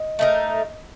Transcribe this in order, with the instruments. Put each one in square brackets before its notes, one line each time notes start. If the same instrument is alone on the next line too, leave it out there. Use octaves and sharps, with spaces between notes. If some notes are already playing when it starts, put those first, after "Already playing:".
Already playing: [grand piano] D#5
[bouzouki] A3 D#4 A#4